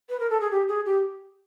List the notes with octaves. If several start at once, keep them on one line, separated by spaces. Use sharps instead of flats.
B4
A#4
A4
G#4
G4
G#4
G4